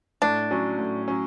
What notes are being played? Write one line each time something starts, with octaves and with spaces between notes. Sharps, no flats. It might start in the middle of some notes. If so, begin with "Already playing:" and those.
A2 D4
F#3 C#4
A2
F#3 C#4